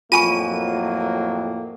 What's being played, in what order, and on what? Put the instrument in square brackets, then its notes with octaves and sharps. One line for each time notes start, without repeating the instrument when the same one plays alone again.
[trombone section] F2 A2 F#3 [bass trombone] A#3 [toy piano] F4 G#5 C#6 [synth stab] D#7